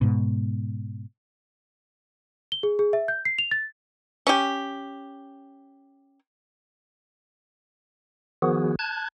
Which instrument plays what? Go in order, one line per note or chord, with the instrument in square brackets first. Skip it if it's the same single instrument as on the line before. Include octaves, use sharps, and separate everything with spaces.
[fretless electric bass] G#2 B2
[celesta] G7
G#4
G#4
E5
G6
C7
F7
A6
[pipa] C#4 G4
[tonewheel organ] D#3 F3 B3 F#4 G#4
A5 F#6 G#6